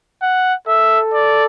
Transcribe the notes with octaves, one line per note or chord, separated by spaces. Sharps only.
F#5
A4 E5
D5